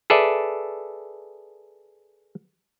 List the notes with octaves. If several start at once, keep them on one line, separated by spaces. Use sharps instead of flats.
G#4 A4 B4 D5 E5